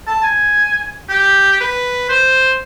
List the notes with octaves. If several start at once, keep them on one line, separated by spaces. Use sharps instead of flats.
A5
G#5
G4
B4
C5